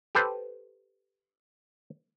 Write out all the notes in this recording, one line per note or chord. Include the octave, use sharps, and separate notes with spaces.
G4 A4 B4 C5